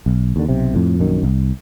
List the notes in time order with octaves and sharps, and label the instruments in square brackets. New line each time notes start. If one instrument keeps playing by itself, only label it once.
[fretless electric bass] B1
D#2 D3
B1 C3
F2 A2
A#1 F#2 D#3
C2